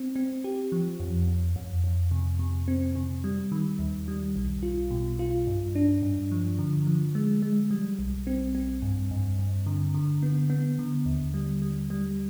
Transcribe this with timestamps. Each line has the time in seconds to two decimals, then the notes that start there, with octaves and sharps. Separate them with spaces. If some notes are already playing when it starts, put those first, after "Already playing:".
Already playing: C4
0.16 C4
0.44 G4
0.72 F3
1.00 F2
1.28 F2
1.56 F2
1.84 F2
2.11 C3
2.39 C3
2.68 C4
2.95 C3
3.24 G3
3.52 D#3
3.79 D#2
4.08 G3
4.36 B1
4.63 F4
4.91 B2
5.19 F4
5.47 G2
5.75 D4
6.02 G2
6.32 F3
6.59 D3
6.87 F3
7.15 G#3
7.42 G#3
7.71 G3
7.99 B1
8.27 C4
8.55 C4
8.82 G2
9.11 G2
9.39 G2
9.66 D3
9.94 D3
10.23 B3
10.50 B3
10.79 D3
11.06 D#2
11.34 G3
11.62 G3
11.90 G3